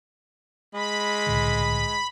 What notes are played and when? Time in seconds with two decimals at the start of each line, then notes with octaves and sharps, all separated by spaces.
0.74 G#3 B5
1.27 C2 A2 D3